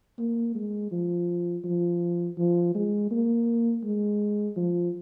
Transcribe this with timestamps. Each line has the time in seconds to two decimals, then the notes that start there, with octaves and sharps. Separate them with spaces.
0.18 A#3
0.55 G#3
0.91 F3
1.64 F3
2.38 F3
2.75 G#3
3.11 A#3
3.84 G#3
4.56 F3